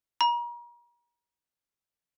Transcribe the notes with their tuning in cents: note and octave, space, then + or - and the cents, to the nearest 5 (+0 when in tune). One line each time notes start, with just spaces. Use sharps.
A#5 +40